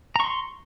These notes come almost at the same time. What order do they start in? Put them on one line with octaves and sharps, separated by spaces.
A#5 C#6 C6